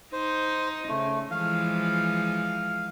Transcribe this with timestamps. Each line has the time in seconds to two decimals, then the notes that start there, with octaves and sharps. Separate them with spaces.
0.13 D#4 C5
0.88 C#3 A3
1.31 E3 F3 G#3 F5